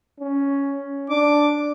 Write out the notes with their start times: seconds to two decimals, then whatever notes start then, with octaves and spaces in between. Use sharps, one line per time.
0.20 C#4
1.10 D4 D6